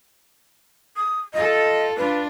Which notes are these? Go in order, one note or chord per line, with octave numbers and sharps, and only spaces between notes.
D#6
F4 A4 D#5
D4 F4 B4